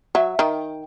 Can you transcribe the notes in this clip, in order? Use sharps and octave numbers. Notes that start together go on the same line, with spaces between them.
F#3 E5
D#3 G5